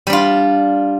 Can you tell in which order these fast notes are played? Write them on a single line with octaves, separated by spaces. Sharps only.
G3 D4 F4